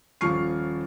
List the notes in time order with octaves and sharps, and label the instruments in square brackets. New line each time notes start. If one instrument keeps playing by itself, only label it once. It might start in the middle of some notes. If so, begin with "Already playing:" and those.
[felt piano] D#1 F3 C#6 F6 C7